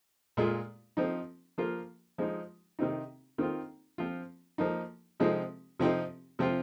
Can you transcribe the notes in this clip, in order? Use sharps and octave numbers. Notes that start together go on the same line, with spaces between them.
A#2 G#3 F4
F3 C4 D#4
F3 A#3 F4
F3 G#3 D#4
C3 D#3 C4 D#4
D#3 C4 F4
F3 C4 F4
F3 A#3 D#4
C3 F3 G#3 C4 D#4
C3 F3 C4 D#4
C3 F3 C4 F4